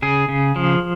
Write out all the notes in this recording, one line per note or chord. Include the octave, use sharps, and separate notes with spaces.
C#3 G#4
C#3
F3